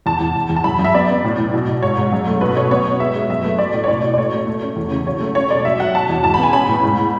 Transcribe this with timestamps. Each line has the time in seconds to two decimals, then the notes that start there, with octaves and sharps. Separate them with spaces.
0.06 E2 A5
0.21 E2
0.36 E2
0.50 E2
0.56 A5
0.64 F#2 B5
0.79 F#2
0.84 E5
0.94 B3 D5
1.09 B3
1.24 A2
1.38 A2
1.54 B2
1.67 B2
1.82 G#2 C#5
1.98 G#2
2.13 F#2
2.27 A3
2.41 B2 B4
2.57 B2 C#5
2.71 B3 C#5
2.86 B2
3.00 G#3 E5
3.16 G#3
3.30 F#2 E5
3.44 A3 B4
3.59 F#3 D5
3.74 A2
3.84 C#5
3.88 B2 D5
4.03 B2
4.14 D5
4.18 A3 C#5
4.33 A3
4.47 A3
4.62 C#4
4.76 E2
4.91 C#3
5.07 F#3 C#5
5.21 A3
5.35 C#4 C#5
5.50 B2 D5
5.65 F#3 E5
5.80 F#3 F#5
5.95 B2 A5
6.09 E2
6.24 G#2 A5
6.34 B5
6.39 B3 G#5
6.53 C#4 B5
6.68 A2
6.83 G#2